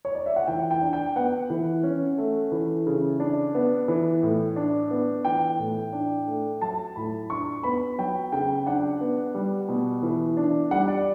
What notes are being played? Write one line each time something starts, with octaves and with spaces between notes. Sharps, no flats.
C#5
D5
E5
F#5
E3 G5
G5
D4
G5
B3 F#5
E3
C#4
A3
E3
C#3
D4
B3
E3
A2
D4
B3
E3 G5
A2
D4
A3
F#3 A5
A2 B5
D4 C#6
B3 B5
F#3 G5
C#3 G5
D4 F#5
B3
G3
B2
E3
D4
G3 F#5
D5